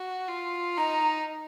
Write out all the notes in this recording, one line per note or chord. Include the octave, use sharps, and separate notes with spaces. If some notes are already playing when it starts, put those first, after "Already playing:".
Already playing: F#4
F4
D#4 A#5